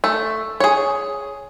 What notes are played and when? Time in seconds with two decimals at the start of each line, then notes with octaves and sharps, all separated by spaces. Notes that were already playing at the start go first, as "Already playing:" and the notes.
0.04 A3
0.60 G#4 C#5